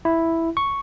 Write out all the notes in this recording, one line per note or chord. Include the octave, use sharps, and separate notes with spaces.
E4
C#6